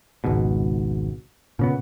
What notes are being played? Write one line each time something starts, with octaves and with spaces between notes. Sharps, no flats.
G#1 C#2 G#2 B2
A#2 C#3 B3